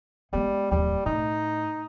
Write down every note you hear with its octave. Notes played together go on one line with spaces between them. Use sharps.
G3 G#3 B3
D1 D#2 G3
A2 D#4